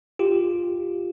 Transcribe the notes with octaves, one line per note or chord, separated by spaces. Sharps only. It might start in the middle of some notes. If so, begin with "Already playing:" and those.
F4 G4